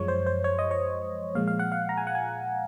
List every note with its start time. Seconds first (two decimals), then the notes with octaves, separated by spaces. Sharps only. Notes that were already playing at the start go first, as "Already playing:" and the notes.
Already playing: F#2 F3 G#3 C#5
0.08 C5
0.26 C5
0.44 C#5
0.59 D#5
0.71 C#5
1.35 A#2 F3 G#3 F5
1.47 F5
1.59 F#5
1.72 F5
1.89 A#5
1.97 G#5
2.07 F#5
2.15 G#5